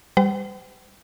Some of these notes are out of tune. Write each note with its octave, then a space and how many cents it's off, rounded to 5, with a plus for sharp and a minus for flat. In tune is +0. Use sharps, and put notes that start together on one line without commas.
G3 +20 C5 -45 G5 -45